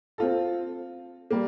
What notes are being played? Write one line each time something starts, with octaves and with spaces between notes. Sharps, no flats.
C4 F4 A4
G3 A#3